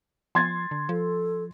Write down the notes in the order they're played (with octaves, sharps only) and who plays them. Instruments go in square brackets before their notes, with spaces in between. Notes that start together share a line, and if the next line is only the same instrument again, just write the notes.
[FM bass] F3 [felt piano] C6 G#6 A6
[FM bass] D3
[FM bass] F3 [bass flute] A4